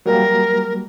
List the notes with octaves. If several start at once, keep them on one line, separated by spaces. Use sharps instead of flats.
F#3 G3 A#3 A#4